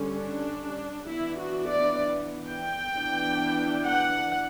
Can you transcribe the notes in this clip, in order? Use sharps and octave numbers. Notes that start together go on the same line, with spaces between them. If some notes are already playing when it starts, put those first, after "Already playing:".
Already playing: D3 G3 C#4
D4
E3 B3 D4 E4
F#4
D5
G5
E3 B3 D4
F#5